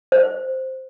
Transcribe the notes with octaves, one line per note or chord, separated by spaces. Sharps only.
C5